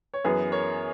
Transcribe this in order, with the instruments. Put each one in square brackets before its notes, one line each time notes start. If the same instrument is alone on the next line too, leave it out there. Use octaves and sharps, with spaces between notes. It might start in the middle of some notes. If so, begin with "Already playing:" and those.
[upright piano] C#5
F#2 E3 B3 G#4 B4
A#4 C#5